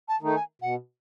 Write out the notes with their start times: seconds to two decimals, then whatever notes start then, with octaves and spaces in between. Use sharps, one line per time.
0.08 A5
0.21 D#3 A3 D#4
0.35 G#5
0.62 B2 F#5